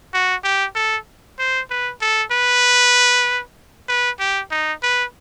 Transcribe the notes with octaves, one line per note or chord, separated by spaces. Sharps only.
F#4
G4
A4
C5
B4
A4
B4
B4
G4
D#4
B4